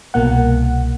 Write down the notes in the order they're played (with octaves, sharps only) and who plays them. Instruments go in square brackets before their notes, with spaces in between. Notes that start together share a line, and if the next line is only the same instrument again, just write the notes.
[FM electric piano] C2 B2 A#3 F#5